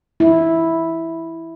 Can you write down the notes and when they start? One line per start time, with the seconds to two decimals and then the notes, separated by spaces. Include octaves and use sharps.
0.20 E4